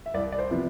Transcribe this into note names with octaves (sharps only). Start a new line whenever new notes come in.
E5
C2 D5
D5
C5
C3 F3 B3